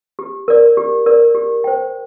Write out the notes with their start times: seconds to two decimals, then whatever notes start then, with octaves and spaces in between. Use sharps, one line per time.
0.19 G4
0.48 A#4 D5
0.77 G4
1.06 A#4 D5
1.35 G4
1.64 C5 G5